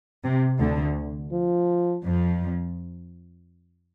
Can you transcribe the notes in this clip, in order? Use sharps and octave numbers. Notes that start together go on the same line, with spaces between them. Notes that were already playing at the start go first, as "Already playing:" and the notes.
C3
D2 D3
F3
F2 F3